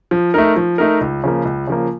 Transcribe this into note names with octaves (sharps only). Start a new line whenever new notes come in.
F3
A3 D#4 A#4
F3
A3 D#4 A#4
C#2
C#3 F3 A#3
C#2
C#3 F3 A#3